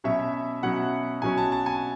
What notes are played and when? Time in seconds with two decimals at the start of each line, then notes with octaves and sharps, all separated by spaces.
0.04 B2 F#3 C#4 E5
0.63 B2 F#3 C#4 F#5
1.22 B2 F#3 C#4 G#5
1.38 A5
1.52 A5
1.66 G#5